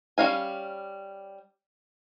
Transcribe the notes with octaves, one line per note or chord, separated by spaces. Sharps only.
G3 C#4 F5 G#5